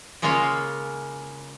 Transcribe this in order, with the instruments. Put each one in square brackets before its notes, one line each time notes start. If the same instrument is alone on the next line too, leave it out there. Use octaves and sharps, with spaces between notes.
[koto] C#3 G#3 A#3 F4 C#5